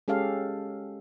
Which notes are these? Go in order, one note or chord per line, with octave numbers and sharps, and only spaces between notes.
G#3 C#4 G4 A4 F5